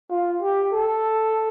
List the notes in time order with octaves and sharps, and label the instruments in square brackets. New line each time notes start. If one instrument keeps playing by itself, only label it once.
[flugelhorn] F4
G4
A4